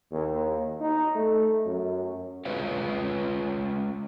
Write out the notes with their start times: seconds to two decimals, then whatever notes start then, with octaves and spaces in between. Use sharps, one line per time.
0.12 D#2
0.81 D#4
1.15 A3
1.65 F#2
2.45 G#3 C#4 F4 B4 C#5 F5